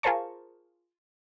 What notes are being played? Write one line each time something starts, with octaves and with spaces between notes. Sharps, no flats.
F4 G#4 A#4 C5 A5 C#6